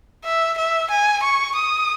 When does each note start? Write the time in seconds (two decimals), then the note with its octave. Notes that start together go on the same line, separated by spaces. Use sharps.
0.25 E5
0.58 E5
0.90 G#5
1.23 C#6
1.56 D#6